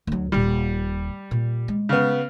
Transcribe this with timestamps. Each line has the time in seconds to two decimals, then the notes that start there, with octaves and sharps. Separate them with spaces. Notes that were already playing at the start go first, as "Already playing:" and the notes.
0.07 D2 F#3
0.32 D#1 A#2 G3
1.31 A#2
1.68 G#3
1.89 C#3 B3